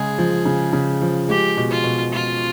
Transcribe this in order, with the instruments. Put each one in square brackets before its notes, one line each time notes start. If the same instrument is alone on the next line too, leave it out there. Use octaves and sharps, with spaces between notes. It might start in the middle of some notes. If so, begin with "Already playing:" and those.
Already playing: [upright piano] C#3 G#3 [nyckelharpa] G#4
[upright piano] F3
C#3
C#3
F3
[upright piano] G#3 [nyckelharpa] G4
[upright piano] B2
[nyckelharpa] F4
[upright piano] B2
[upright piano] G#3 [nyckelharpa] F4